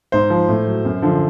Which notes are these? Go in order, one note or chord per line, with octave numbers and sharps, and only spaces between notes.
G#2 C5
F3
A2
F#3
F#2
D3 F3